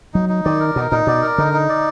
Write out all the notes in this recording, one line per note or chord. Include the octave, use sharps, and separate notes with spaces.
F#3 D#4
D#4
D#3 D5
A#4
B2 D#4
A#2 D#4
B2 D5
A#4
D3 D#4
D#4
D5